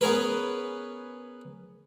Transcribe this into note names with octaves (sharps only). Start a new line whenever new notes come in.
B3 C#4 G#4 A#4 B4